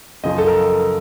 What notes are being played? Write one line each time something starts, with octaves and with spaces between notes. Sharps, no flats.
F#2 C#3 F3 D#5
A4
A#4